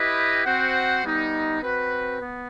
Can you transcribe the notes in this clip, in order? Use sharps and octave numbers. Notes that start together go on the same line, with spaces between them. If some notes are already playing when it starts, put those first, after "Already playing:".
Already playing: E4 G4 B4 D#5 G5
C4 F#4 C5 F#5
G3 B3 D#4
C4 F#4 B4
B3